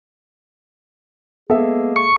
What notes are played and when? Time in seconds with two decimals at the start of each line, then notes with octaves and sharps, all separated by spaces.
1.50 G#3 A#3 B3 G#4 A4 E5
1.96 C#6